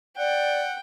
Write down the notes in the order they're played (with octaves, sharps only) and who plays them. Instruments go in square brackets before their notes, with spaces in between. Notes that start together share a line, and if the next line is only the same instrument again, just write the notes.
[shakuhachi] D5 [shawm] F#5 [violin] G5